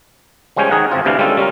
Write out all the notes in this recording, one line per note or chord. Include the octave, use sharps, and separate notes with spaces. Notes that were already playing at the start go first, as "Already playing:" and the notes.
F3 G3 G#3 C#4 C5 C#5
D#3 G#4 A#4 F#5
G#1 F3 C4 F4
D2 C3 E3 D4 F5
G3 G#3 C#4 D4 F4 A4
G3 C#4 F4 A#4